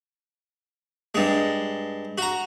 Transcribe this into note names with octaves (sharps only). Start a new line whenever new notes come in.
G2 G#3
F#4 A#5